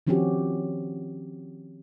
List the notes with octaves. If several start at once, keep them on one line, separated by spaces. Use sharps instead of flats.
D#3 F3 C4 C#4 F#4 G4